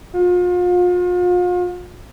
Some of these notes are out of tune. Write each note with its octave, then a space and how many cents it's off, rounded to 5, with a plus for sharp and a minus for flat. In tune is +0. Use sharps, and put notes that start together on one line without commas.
F4 +40